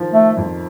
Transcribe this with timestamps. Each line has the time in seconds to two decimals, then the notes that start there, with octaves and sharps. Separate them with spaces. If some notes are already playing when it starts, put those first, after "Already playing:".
Already playing: D#3 F3
0.14 A3
0.37 F2